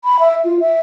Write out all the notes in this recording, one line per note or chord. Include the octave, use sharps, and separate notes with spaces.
B5
E5
F4
E5